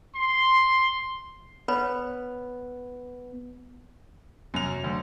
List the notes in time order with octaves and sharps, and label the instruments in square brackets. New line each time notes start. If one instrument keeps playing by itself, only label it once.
[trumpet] C6
[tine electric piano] B3 [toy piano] B4 C#5 B5
[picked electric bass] F1 F#3 [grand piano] F#2 F7
[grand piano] D2